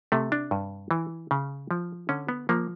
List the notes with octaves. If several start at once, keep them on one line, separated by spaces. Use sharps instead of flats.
C3 A3
D4
G2
E3
C#3
F3
D3 C#4
B3
F3 A#3